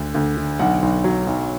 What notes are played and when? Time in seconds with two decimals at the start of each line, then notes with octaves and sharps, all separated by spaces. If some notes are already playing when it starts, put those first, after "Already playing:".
Already playing: D2 D3
0.15 D2
0.37 D3
0.59 B1 F#5
0.82 B1
1.04 F#3
1.27 B1